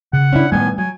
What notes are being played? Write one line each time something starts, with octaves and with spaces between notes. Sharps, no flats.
C#3 F#5
C#4 D4 E4
A2 D#3 G3 A3 B3 G#5
F#3 G#5